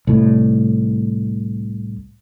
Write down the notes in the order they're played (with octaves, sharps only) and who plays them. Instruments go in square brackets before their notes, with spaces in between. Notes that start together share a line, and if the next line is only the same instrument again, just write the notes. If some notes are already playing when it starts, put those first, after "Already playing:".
[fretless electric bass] C2 A2